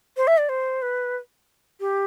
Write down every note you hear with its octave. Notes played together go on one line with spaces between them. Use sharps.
C5
E5
D5
C5
B4
G4